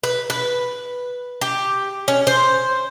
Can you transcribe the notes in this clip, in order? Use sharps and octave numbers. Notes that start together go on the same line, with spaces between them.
B4
B4
G4
C#4
C5